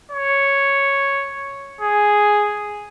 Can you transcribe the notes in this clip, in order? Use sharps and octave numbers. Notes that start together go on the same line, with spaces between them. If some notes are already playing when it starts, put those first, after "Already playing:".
C#5
G#4